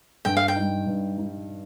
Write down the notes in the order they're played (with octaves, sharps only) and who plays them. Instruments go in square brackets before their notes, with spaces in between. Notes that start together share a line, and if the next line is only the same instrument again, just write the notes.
[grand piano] G2 [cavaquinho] G5
[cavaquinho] F5
G5
[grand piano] G3 D#4
G2
G3 D#4